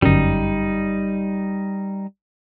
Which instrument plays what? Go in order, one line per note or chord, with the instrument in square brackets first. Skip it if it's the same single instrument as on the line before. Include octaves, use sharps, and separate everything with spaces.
[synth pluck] G1 F#2 [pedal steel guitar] G3 D#4